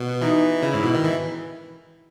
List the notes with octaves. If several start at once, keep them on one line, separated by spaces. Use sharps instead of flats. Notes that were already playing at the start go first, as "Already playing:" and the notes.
Already playing: B2
E3 D#4
C#3 E4
G#2
B2
D#3
E3